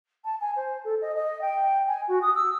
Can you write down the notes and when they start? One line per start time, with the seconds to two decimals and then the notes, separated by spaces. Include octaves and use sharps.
0.24 A5
0.40 G#5
0.56 C5
0.84 A4
1.01 D#5
1.15 D#5
1.41 G5
1.87 G#5
2.08 F#4
2.22 D#6
2.34 E6